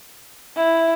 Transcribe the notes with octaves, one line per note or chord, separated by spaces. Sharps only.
E4